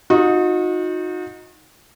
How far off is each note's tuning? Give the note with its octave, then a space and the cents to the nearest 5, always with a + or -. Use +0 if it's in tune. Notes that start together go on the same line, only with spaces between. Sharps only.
D#4 +5 F#4 -40